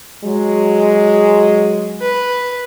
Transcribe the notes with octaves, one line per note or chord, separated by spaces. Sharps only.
F#3 G#3
B4